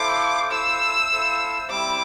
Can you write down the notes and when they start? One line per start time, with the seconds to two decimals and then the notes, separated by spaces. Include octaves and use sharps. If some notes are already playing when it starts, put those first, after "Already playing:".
Already playing: E4 A4 C5 F5 D6
0.51 E4 A4 C5 F5 E6
1.10 E4 A4 C5 F5
1.70 G3 C4 E4 D6